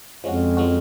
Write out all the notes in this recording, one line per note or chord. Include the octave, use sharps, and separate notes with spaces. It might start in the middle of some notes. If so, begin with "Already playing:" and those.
F2 F3 G#3 C#4 F#4
F3 G#3 C#4 F#4